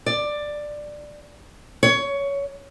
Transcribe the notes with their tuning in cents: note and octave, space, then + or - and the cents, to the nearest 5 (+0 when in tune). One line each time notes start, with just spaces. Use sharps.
D5 +10
C#5 +15